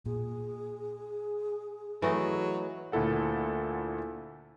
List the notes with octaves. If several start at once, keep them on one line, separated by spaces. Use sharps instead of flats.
A#2 G#4
E3 F#3 A3 D#5
D2 A#2 E4 A4 F#5